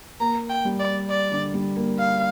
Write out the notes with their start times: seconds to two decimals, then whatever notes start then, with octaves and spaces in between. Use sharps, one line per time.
0.20 A#3 A#5
0.49 G5
0.65 G3
0.79 D5
1.10 D5
1.31 D3
1.54 G3
1.76 A#3
1.99 F5